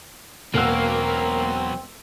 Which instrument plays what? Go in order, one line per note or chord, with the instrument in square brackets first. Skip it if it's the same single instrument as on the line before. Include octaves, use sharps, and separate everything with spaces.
[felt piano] E1 F#5 E6 [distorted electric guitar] B2 F#3 [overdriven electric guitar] A#3 [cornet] C4